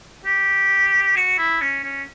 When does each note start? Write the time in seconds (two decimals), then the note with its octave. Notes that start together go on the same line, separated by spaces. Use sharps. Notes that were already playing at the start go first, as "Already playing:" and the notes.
0.25 G4
1.16 F#4
1.38 E4
1.61 C#4
1.84 C#4